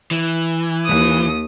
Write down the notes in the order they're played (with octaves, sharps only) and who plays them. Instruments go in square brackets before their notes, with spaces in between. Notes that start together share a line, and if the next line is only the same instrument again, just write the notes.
[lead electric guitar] E3
[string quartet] D#2 D#6